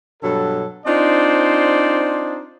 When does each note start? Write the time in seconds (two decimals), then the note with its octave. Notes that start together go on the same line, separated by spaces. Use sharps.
0.22 G2 B2 F#3 A4
0.86 C4 D4 D#4 F4 C5 D5